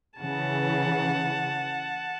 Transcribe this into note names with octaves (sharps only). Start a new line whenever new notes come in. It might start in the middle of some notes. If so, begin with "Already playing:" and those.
C#3 E3 F#5 A5